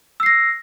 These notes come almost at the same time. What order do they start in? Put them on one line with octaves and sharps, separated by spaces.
E6 C7 A#6